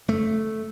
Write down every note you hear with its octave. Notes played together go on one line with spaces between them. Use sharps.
F#1 A3